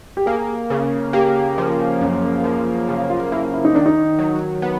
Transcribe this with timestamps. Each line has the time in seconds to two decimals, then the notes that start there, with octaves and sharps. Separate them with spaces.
0.17 G4
0.26 A#3 G#4
0.70 C#3
1.13 A#3 G4
1.58 F3
2.01 F#2
2.44 F3
2.89 C#3
3.10 F4
3.32 A#3 E4
3.54 E4
3.65 D#4
3.75 D#3 D4
3.86 D#4
4.19 F#3
4.62 B3